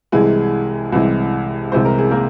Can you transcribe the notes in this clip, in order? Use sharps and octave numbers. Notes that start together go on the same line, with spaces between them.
C2 C3 E3 G#3 G#4
C2 C3 E3 G#3
C2 C3 E3 G#3 C5
A#4
G#4
A#3 A#4